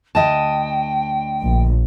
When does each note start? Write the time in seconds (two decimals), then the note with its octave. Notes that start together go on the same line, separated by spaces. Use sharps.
0.15 D2 D#5 G5 A5
1.43 A#1